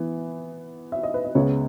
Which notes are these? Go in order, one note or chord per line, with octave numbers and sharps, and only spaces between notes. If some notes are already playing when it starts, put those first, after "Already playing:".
Already playing: E3 B3
E5
D#5
B4
D#5
C#2 C#3 G#3 B3 C#5